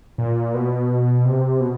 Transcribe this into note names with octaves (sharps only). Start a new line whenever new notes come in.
A#2
B2
C3
B2